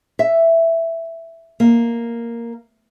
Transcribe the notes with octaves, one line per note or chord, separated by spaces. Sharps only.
E5
A#3